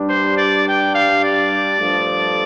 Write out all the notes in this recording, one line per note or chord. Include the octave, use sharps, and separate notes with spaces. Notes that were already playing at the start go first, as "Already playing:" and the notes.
Already playing: G2 G3 D4
C5
D5
G5
F5
D5
G2 F3 A3